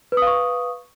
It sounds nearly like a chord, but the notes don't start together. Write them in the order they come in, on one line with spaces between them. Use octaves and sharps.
B4 D#6 F5 C#6